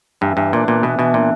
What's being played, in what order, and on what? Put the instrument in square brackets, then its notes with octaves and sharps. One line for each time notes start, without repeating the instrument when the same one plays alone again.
[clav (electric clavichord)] G2 [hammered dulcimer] E3
[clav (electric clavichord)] G2 [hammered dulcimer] E3
[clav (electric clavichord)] A#2 [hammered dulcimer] D4
[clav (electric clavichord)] A#2 [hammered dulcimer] B3
[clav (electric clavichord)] B2 [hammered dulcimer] E3
[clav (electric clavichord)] B2 [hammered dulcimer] E3
[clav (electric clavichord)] A#2 [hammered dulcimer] D4